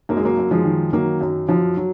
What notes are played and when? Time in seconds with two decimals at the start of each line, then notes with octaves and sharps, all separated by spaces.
0.09 F#2 A#3
0.17 G#3
0.25 F#3 A#3
0.38 F#2
0.51 F3 G#3
0.64 D#3
0.93 D#3 F#3 A#3
1.21 F#2
1.48 F#2 F3
1.77 F#3